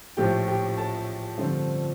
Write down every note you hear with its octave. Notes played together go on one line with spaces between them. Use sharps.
A#1 A2 F3 A3 G4 G5
G4 G5
A4 A5
G2 D3 F3 A3 C4